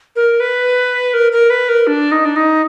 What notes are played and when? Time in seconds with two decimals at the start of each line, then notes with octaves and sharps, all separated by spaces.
0.16 A#4
0.40 B4
1.14 A#4
1.32 A#4
1.50 B4
1.69 A#4
1.87 D4
2.12 D#4
2.25 D4
2.36 D#4